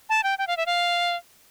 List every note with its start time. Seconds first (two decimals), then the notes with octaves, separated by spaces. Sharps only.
0.09 A5
0.24 G5
0.39 G5
0.47 F5
0.57 E5
0.66 F5